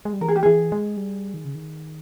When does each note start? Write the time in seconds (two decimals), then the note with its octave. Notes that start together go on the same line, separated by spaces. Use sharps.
0.05 G#3
0.13 G3
0.21 E3 A#4
0.28 G#4
0.36 G4
0.43 E3 G#4
0.72 G#3
0.97 G3
1.34 D#3
1.45 C#3
1.55 D#3